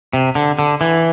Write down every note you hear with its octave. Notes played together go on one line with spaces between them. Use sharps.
C3
D3
D3
E3